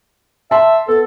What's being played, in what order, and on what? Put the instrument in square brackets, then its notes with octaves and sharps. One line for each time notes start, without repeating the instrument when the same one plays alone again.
[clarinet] E5 [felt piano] A5 C6
[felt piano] B3 [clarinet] A4